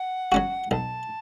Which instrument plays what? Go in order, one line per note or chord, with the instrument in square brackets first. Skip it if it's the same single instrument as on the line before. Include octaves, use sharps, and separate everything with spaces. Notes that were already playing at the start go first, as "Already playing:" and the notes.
Already playing: [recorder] F#5
[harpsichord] F#3 C#4 F#4
[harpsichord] B1 [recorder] A5